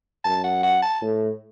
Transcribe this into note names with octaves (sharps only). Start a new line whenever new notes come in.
F#2 A5
F#5
F#5
A5
A2